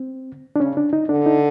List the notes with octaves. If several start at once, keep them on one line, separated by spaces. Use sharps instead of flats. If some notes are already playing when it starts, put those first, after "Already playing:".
Already playing: C4
D4
C#3 C#4
D4
D#4
D3 D4
D#4